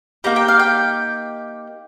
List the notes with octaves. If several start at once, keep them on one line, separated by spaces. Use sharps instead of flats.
A#3 D#4 G4 A#5
G5
F5
G5